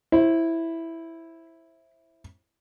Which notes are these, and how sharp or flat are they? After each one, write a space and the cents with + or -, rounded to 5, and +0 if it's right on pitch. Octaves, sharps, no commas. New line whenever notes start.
E4 +0 C5 +25